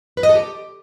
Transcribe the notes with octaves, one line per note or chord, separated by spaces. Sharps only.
B4
D#5
A4
G4